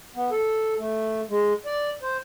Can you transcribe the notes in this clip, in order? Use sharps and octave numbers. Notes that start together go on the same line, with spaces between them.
B3
A4
A3
G#3
D5
C5